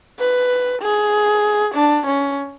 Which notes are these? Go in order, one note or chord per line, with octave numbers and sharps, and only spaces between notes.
B4
G#4
D4
C#4